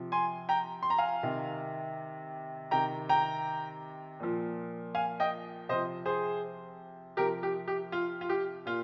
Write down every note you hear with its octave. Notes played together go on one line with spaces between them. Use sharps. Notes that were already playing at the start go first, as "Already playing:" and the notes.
Already playing: C3 F3
G#5 C6
G5 A#5
C6
A#5
F5 G#5
C3 D#3
C3 D#3 G5 A#5
G5 A#5
A#2 F3
F5 G#5
D#5 G5
C3 F3 C5 D#5
G#4 C5
C3 F3 G4 A#4
G4
G4
F4
F4
G4
A#2 F4